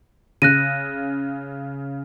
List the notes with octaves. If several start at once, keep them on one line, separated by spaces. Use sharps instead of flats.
C#3 F#6 A#6 D#7